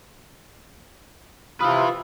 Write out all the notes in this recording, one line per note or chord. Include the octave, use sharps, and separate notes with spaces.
C3 F4 B4 E5 B5 D#6 F6